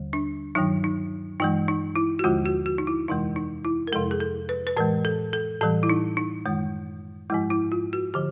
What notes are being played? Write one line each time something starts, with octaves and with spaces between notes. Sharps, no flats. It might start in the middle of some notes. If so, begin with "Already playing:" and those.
Already playing: D#2 D3 G3
D4
G2 D#3 F#3 D#4
D#4
G2 E3 G#3 D#4
D#4
E4
F#4
D#2 D3 F3 G#3 F4
F#4
F#4
D#4
E4
F2 C3 E3 G#3 D#4
D#4
E4
A#4
F2 C3 F3 G#3 A4
G#4
A4
B4
B4
A2 E3 G#3 A#4
A4
A4
A2 E3 G3 A4
E4
D#4
D#4
F#2 D#3 G#3
G#2 F3 G#3 E4
E4
F4
F#4
D3 F3 G4